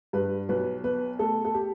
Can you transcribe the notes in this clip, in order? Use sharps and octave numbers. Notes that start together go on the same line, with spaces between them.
G2 B4
B1 B4
B2 B4
A3 A4
A4
G4